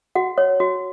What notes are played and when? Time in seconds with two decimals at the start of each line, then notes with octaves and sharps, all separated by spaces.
0.15 F#4 F#5
0.38 C#5
0.60 F#4